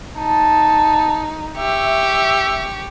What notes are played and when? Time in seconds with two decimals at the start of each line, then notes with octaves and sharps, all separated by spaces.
0.18 D#4 A5
1.57 G4 E5 C#6